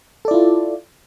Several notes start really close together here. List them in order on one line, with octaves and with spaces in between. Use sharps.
A4 D5 E4 F4